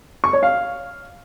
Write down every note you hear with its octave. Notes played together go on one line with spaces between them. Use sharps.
C#6
C#5
F5